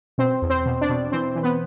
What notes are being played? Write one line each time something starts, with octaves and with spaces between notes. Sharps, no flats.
B2 C4 C5
E2
C4 C5
B2
D4 D5
B2
E3 C4 C5
E3
B3 B4